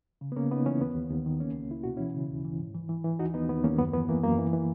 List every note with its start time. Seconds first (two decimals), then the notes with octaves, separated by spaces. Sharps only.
0.21 C#3
0.32 B3
0.36 C#3 A#3 C#4
0.51 C#3 B3 D#4
0.66 E3 C#4 E4
0.81 D#2 B3
0.95 D#2
1.11 D#2
1.26 D#3
1.40 C#2 A#3 C#4
1.56 C#2
1.70 C#2 E4
1.84 B2 F#4
1.97 E3 C#4 E4
2.15 C#3
2.30 D#2
2.45 E3
2.60 G#2
2.74 E3
2.89 E3
3.04 E3
3.19 D#2 D#4 F#4
3.34 D#2 B3 D#4
3.49 D#2 B3
3.64 D#2 A#3 C#4
3.79 F#2 B3
3.93 E3 B3
4.09 E3 A#3
4.24 F#2 A#3
4.38 E3
4.53 E3